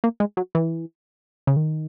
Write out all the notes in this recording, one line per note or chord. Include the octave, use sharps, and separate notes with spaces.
A#3
G#3
F#3
E3
C#3
D#3